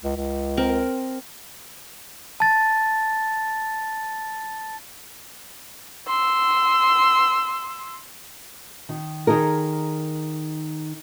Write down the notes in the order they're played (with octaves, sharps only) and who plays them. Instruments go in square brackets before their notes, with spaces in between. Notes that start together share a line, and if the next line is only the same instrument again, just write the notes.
[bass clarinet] C#2
C#2
[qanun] C4 A#4
[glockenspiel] A5 A6
[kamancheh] C6 E6
[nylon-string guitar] D#3
D#3 D#4 G#4 A#4